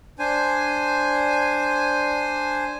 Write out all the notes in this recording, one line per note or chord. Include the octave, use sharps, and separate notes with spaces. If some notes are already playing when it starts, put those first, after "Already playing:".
D4 C5 G#5